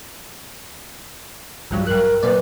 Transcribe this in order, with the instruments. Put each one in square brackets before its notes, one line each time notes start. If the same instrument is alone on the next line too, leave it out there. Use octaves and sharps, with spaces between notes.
[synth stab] A#1 G2 F#3
[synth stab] G2 F#6 [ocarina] A#4
[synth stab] F#2 A#2 D5 [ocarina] B4